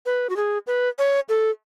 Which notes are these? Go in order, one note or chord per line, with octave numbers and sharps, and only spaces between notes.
B4
F#4
G#4
B4
C#5
A4